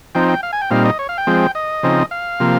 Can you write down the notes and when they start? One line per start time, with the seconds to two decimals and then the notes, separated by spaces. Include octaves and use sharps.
0.15 F3 C4 D#4 G5
0.28 G5
0.43 F5
0.53 G#5
0.61 G5
0.71 A#2 G3 C4 D#4 F5
0.85 D#5
0.99 C#5
1.09 F5
1.18 G5
1.27 F3 G#3 C4
1.55 D#5
1.83 C#3 F3 C4 D#4
2.11 F5
2.40 C3 F3 A#3